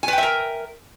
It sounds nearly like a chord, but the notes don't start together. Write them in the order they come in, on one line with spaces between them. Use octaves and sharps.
G#5 B4 G5 E5 A#4